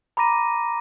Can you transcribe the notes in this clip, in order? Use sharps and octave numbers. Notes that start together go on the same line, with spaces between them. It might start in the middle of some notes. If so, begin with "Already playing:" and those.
A#5 B5 D6 A#6 D#7